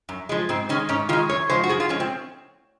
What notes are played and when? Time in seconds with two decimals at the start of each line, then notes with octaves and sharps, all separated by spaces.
0.09 F#2
0.29 F3 G#3
0.49 G#2 C4
0.69 D#3 G#3 C#4
0.89 G#2 C#4
1.09 D#3 G#3 F4
1.29 F#2 C#5
1.50 F3 G#3 C5
1.64 F#4
1.69 F#2 G#4
1.80 F4
1.89 F3 G#3 C#4
2.00 C4